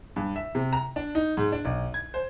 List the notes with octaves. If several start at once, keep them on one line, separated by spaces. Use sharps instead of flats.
G2
E5
C3
A#5
D4
D#4
G#2
D4
B1
G#6
C5